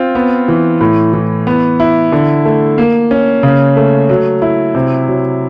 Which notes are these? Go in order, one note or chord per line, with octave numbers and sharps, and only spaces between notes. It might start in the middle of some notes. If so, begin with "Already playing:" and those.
Already playing: C4 F4
B3
E3
A2
E3
B3
E4
D3
A3
A#3
C#4
C#3
A3
F#3
E4
C3
F#3